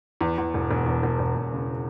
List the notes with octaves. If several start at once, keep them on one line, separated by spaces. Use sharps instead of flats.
E2
E2
E1
E1
E2
E1
E1
E1
C#3